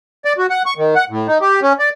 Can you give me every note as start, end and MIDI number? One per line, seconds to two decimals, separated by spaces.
0.25 0.33 74
0.38 0.47 66
0.50 0.62 78
0.66 0.74 85
0.77 0.95 51
0.95 1.04 78
1.10 1.27 45
1.28 1.38 63
1.41 1.60 67
1.62 1.73 61
1.79 1.89 74